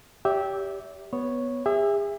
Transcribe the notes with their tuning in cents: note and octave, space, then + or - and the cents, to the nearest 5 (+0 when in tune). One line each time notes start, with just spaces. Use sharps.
G4 +0 C#5 +45 E5 -15
B3 +0 C#5 -5
G#4 -40 E5 +0